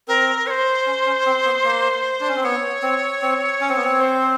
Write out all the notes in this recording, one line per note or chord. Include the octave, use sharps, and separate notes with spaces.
C4 A#4
C#5
C5
C#4
C#4
C4
B3
A#3
D4
C#4
C4
B3 C#5
C4
C4
C#4
C4
B3
C4
C5